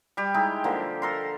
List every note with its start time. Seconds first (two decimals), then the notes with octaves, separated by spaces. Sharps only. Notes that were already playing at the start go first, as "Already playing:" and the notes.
0.17 G3 G4
0.34 G#3 D#4 E4 G4
0.64 D3 F3 A#3
1.02 A4 A#4 C6